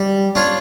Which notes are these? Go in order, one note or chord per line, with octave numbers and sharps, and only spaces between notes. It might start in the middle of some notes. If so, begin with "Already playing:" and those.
Already playing: G3
D4 F4 C#5